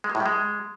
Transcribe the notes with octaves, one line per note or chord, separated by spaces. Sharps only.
G#3
A#3
A2
G3
G#3